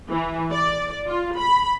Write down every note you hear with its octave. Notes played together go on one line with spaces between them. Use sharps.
E3
D5
F4
B5